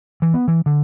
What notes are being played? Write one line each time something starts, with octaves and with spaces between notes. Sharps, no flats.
E3
B3
E3
D3